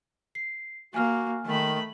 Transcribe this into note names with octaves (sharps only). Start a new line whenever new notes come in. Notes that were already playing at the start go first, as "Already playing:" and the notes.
C7
A#3 F#4 G#5 F6
D#3 A3 B5